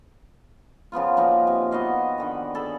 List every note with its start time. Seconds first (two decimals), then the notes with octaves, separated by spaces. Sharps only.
0.92 C#3 F3 B3 F4
1.17 B2 F3 A#3 D#4
1.47 C3
1.71 B3 F#4 D#5 F5
2.18 D3 D#3 B5
2.54 G#4 A4 B5